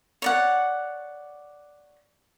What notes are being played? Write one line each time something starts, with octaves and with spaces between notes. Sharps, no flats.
C#5 D5 F#5